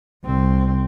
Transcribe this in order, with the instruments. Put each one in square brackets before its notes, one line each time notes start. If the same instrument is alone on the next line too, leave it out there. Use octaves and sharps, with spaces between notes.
[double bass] C2 C4